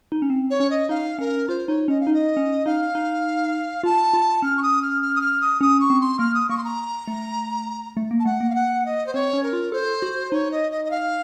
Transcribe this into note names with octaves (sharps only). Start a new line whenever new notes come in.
D#4
C#4
C4
C#5
C#4
D#5
D#4 F5
C#4 A#4
F4 C5
D#4 C#5
C#4 D#5
F5
D#4
D#5
C#4
D#4 F5
D#4
F4 A5
F4
C#4 F6
C#6
D#6
F6
F6
D#6
F6
D#6
C#4 D#6
C#6
C4
C6
A#3 F6
D#6
A#3 C#6
C6
A#5
A3
A3
A#3
A5
A3 F#5
A#3
F5
F#5
D#5
C5
C4 C#5
C#4
A#4
F4
A4 C5
F#4
D#4 C#5
D#5
D#5
D#5
F5